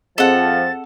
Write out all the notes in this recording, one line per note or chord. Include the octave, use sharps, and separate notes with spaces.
F2 F3 C4 G#4 A4 D#5 F#5 A6